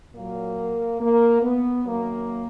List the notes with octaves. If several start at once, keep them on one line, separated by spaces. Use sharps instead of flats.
A#2 F#3 A#3
A#3
B3
F#2 D#3 F#3 A#3